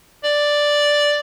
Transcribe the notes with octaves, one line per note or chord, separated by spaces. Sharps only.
D5